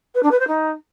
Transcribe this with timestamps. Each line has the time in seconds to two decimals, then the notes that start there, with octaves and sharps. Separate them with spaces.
0.15 B4
0.23 D4
0.31 B4
0.39 C5
0.48 D#4